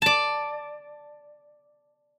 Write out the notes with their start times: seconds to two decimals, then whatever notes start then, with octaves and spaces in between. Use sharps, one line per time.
0.02 D5 A5